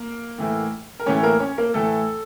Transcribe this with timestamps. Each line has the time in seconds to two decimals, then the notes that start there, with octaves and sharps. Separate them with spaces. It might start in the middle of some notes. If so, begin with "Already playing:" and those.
Already playing: A#3 A#4
0.39 A2 E3 A3
1.00 A#4
1.06 A2 E3 A3 C#4 C#5
1.23 A#3 A#4
1.40 C#4 C#5
1.58 A#3 A#4
1.74 A2 E3 A3 A4